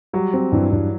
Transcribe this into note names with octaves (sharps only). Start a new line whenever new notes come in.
F#3 G3
C4
G2 E3
G2